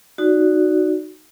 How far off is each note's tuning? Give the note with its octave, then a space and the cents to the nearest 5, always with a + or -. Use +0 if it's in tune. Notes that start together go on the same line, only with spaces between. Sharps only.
D#4 -10 F#4 +0 D5 -10